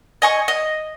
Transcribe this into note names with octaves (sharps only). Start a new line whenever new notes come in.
D#5 G#5 C#6
D#5